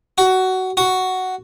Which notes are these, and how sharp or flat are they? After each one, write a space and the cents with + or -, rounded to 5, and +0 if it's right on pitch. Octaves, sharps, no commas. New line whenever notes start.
F#4 +15
F#4 +5